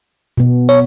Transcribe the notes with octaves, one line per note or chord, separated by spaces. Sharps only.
B2 B3
C#5